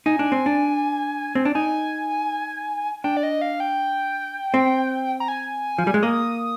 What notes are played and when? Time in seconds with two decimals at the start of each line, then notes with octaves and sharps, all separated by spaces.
0.06 D#4 G#5
0.19 D4
0.32 C4
0.46 D4
1.35 C4
1.45 D4
1.55 D#4 G#5
3.04 D4 G5
3.17 D5
3.23 D#5
3.42 F5
3.60 G5
4.54 C4
5.20 A#5
5.28 G#5
5.78 F3
5.87 G3
5.94 G#3
6.02 A#3 D#6